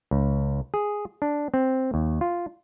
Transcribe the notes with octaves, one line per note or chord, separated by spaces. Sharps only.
C#2
G#4
D4
C4
D#2
F4